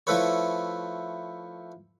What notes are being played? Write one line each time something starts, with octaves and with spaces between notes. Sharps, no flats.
F3 A3 E4 B4 C#5